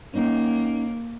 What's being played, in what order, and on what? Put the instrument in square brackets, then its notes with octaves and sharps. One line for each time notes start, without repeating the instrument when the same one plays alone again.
[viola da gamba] A#3 [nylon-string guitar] C#4 D#4